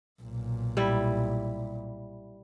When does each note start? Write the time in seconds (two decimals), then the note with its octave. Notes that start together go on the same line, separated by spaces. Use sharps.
0.22 B1 A#2
0.77 G3 E4